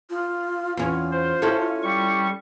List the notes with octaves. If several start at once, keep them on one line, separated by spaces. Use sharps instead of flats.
F4
E2 C#4 F4
C5
C#4 E4 A4
G3 C#6